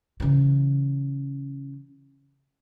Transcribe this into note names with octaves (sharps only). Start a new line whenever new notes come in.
C#3 E3